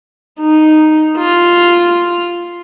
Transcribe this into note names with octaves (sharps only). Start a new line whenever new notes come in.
D#4
F4